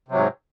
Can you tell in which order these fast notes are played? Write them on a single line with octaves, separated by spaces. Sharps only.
C3 F#3 G#2